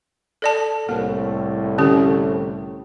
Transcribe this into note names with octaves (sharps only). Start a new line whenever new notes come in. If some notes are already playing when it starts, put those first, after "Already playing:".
A4 D5 A5
C2 A2 A#3 A#4
D3 C#4 G4